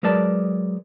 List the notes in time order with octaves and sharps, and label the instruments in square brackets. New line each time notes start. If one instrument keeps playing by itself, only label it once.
[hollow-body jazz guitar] F#3 G#3 A#4 B4 D5 A5